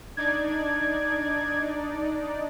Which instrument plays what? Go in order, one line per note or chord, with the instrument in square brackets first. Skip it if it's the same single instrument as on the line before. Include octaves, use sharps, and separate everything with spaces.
[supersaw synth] D4 D#4 D5 [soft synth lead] G#6